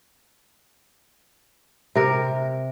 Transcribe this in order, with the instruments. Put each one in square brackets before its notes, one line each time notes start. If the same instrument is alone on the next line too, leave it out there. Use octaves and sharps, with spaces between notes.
[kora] C3 A#4